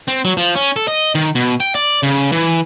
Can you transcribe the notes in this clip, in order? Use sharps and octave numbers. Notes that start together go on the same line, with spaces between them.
C4
F#3
F3
C#4
A4
D#5
D#3
B2
G5
D5
C#3
E3